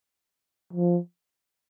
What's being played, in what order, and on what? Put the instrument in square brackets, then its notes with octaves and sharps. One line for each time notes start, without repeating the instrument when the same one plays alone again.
[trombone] F3